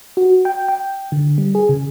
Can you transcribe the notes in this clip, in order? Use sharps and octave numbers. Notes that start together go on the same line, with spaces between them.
F#4
G5
G5
D3
G3
G#4
C#3